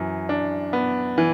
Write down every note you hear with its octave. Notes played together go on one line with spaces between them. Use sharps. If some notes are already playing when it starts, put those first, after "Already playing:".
Already playing: F#2 E3
D4
B3
E3